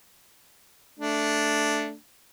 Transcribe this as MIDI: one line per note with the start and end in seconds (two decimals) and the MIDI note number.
0.99 1.94 57
0.99 1.94 62